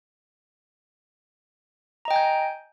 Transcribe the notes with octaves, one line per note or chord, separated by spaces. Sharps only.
D#5 G5 G#5 A#5 G6